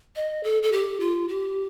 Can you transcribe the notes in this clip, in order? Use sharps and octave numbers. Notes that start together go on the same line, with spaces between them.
D#5
A4
A4
G4
F4
G4